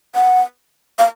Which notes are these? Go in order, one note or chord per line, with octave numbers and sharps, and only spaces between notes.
F#5
F5